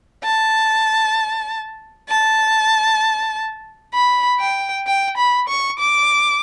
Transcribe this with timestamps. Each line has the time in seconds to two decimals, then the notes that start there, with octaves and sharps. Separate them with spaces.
0.25 A5
2.10 A5
3.95 B5
4.41 G5
4.87 G5
5.18 B5
5.49 C#6
5.80 D6